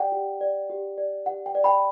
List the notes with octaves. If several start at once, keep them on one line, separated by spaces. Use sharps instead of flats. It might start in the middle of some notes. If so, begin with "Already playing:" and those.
Already playing: G4 D5 F#5 G5
G4
D5
G4
D5
G4 F#5
G5
D5
G5 B5